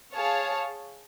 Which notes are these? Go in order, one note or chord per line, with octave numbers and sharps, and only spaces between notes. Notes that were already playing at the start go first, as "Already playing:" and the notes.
G#4 C#5 F5 A5